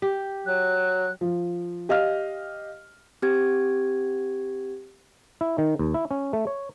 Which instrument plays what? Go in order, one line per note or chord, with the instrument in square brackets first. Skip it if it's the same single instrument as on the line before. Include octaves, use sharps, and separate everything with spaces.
[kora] G4
[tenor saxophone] F#3 [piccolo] F#6
[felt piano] F3
G4 D#5 F5 F6
[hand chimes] C4 G4 G#6
[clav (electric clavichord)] E4
D#3
D#2
E4
C#4
A3
C#5